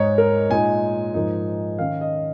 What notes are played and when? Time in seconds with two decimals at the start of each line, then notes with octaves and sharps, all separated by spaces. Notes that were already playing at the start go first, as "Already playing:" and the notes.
Already playing: G#2 G#3 D#4 C#5
0.18 A#4
0.50 A#2 G#3 D#4 G#5
1.14 G#2 F3 A#3 D#4
1.79 D#3 C#4 F5
2.01 D#5